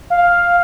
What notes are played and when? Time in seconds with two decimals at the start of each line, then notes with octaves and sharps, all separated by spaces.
0.10 F5